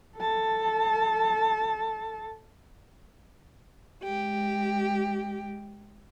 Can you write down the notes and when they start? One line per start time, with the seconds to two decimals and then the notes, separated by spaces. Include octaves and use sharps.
0.18 A4 A5
4.04 G#3 G4